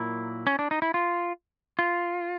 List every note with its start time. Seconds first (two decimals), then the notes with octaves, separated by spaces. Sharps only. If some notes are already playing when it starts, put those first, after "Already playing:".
Already playing: A#2 F#3 A#3 E4
0.47 C#4
0.59 D4
0.71 D#4
0.82 E4
0.94 F4
1.79 F4